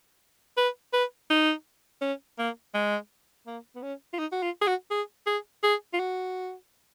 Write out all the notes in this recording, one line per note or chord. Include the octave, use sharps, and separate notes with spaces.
B4
B4
D#4
C#4
A#3
G#3
A#3
B3
C#4
F4
D#4
F#4
F4
G#4
F#4
G#4
G#4
G#4
F4
F#4